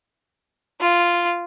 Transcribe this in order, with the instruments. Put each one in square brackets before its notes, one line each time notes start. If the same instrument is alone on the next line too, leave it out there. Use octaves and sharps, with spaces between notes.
[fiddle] F4